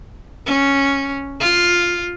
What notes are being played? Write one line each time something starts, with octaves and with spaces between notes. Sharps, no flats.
C#4
F4